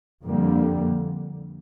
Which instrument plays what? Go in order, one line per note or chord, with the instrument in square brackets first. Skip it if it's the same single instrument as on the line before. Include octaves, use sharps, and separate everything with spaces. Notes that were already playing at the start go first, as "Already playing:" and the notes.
[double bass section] F2 D3 G3 A#3